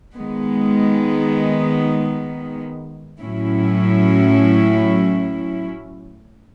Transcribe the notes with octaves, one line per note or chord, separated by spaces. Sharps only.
D#3 G#3 B3
A2 F#3 C#4 E4